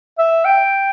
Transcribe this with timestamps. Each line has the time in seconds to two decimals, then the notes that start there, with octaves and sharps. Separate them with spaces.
0.18 E5
0.45 G5